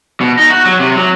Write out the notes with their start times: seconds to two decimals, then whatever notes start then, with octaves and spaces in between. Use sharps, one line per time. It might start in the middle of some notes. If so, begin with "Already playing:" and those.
0.21 B2
0.38 D#4
0.50 F#4
0.66 F#3
0.80 C3
0.96 F#3